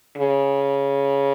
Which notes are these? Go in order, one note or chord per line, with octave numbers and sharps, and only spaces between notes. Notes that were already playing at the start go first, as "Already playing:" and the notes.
C#3